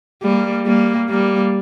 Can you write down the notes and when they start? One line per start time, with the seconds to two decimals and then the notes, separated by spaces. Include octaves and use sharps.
0.23 G3 A#3
0.66 G3 A#3
1.09 G3 A#3